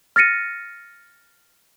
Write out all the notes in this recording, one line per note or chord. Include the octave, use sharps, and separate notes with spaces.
F6 A6 A#6 C#7 D#7